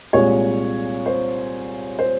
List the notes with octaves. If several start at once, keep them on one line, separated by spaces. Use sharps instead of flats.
C2 A#2 G#3 C#5
C5
C5